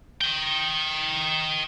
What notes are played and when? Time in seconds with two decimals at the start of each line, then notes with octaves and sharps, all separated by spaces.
0.21 D#5 G5